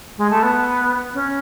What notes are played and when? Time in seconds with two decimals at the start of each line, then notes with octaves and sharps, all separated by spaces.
0.18 G#3
0.30 A3
0.43 B3
1.14 C#4